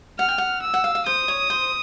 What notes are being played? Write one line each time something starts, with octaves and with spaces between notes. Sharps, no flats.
F#5 F6
G5
F#5
E6
F#5
F5
F5
C5 D#6
C#5
C5